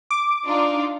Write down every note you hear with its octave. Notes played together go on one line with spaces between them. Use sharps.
D6
D4 D#4 F4